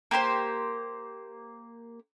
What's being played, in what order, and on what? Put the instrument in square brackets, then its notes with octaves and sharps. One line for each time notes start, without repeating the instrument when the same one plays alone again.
[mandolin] A#3 G4 B4 C5